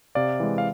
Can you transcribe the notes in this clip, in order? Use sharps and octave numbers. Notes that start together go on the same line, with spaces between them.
C3 D5 F5
E3 G#3
F5